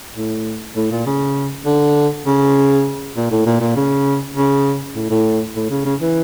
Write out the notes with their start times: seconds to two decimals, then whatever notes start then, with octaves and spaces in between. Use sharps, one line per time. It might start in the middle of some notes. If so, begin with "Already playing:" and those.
0.17 A2
0.76 A2
0.91 A#2
1.06 C#3
1.66 D3
2.26 C#3
3.17 A#2
3.31 A2
3.46 A#2
3.61 A#2
3.76 C#3
4.36 C#3
4.95 A2
5.10 A2
5.56 A2
5.70 C#3
5.85 C#3
6.01 E3